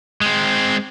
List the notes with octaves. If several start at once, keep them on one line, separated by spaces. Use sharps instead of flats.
G#3 C4